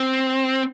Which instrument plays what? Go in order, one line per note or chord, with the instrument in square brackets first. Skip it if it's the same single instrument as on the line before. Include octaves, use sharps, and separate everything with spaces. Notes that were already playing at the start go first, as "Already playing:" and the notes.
Already playing: [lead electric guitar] C4